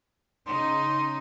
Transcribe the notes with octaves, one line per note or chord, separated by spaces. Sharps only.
C#3 D#4 C6